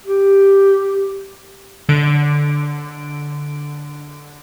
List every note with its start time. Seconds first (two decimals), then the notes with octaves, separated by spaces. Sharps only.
0.05 G4
1.89 D3 D7